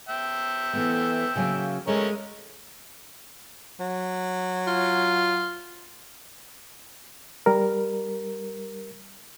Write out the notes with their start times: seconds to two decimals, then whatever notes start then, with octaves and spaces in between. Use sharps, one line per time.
0.09 E5 G5
0.73 E3 A3 B3
1.36 C#3 F#3 A#3
1.88 G#3 A3 C#4 A#4
3.80 F#3
4.67 F4
7.46 G3 A#4